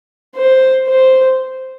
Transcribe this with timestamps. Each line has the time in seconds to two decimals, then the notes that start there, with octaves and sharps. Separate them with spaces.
0.36 C5
0.87 C5